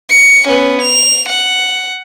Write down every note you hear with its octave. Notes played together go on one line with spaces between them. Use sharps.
C#7
B3 C#4
F7
F#5